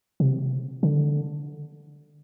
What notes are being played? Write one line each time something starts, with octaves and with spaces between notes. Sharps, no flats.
C3
D3